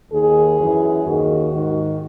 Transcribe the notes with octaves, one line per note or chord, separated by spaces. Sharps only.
D#2 D#3 G#4
F#2 E3
D#2 D#3 F#4
G#2 D#3